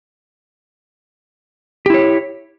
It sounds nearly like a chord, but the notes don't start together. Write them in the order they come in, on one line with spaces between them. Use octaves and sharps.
G4 E4 C#5